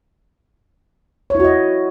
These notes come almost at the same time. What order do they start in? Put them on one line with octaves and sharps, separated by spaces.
C#5 E4 F#4 D#5